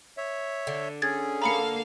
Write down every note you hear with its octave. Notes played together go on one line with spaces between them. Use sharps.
C#5 E5
D3
C#4 G#4 G#6 A6
A#3 A4 F5 A#5 B5 C#7